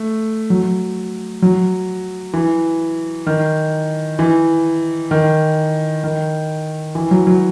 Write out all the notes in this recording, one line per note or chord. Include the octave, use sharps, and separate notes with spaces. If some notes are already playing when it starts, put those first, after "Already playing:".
Already playing: A3
F#3
F#3
E3
D#3
E3
D#3
D#3
E3
F#3
F#3